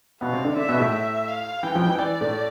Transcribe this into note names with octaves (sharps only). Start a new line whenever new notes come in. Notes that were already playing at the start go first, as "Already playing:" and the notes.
B2 B3 F5
C3 C4
D3 D4
D3 D4 E5
B2 B3
A2 A3
E5
F5
E3 G5
F2 F3
E3
E3 D5
A2 A3